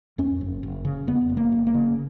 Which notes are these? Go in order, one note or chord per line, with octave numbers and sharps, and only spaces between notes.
F2 C#4
F#1
F#1
C#3
F2 B3
F#1
A#3
F#1
A#3
C#3